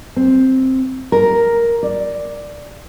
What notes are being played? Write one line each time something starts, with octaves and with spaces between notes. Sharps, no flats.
C4
A#4
D5